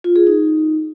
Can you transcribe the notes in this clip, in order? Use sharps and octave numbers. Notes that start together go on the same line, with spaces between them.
F4
G#4
D#4